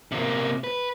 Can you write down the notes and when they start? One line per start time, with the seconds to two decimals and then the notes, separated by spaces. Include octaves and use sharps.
0.12 C3 A#3
0.64 B4